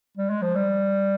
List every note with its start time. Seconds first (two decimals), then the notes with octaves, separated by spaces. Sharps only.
0.17 G3
0.30 G#3
0.42 F3
0.55 G3